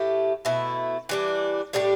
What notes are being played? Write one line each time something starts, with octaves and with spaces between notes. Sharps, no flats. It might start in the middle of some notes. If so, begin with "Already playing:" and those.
Already playing: A2 A3 G4
B2 A3 E4
E3 G3 D4
A2 G3 D4 G4